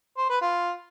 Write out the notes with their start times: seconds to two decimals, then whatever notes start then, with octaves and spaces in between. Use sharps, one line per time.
0.17 C5
0.29 B4
0.41 F4